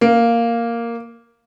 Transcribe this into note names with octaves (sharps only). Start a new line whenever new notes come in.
A#3